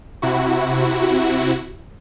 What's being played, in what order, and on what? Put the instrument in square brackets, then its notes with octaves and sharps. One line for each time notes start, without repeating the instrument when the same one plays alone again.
[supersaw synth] C3 E4 F#4